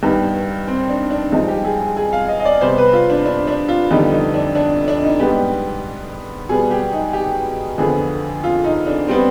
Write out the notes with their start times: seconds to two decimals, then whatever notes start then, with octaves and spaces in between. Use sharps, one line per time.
0.03 G2 D#3 B3 G4
0.68 C4
0.89 D4
1.10 D4
1.32 G2 F3 G#3 D#4
1.48 G4
1.64 G#4
1.81 G#4
1.97 G#4
2.13 F5
2.28 D#5
2.40 D#5
2.45 D5
2.61 C3 G3 B3 C5
2.78 B4
2.93 F4
3.10 D4
3.26 D4
3.48 D4
3.68 F4
3.91 F2 D3 G3 B3 D#4
4.12 D#4
4.34 D4
4.55 D4
4.88 D4
5.04 D#4
5.20 G#2 G3 B3 G4
6.49 B2 G3 B3 G#4
6.71 G4
6.93 D#4
7.13 G4
7.78 F2 D3 F3 B3 G#4
8.44 F4
8.64 D#4
8.87 D4
9.08 G3 B3 C4